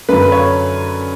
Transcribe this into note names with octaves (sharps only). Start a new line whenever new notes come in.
F#2 D3 F#3 B4
B4
C#5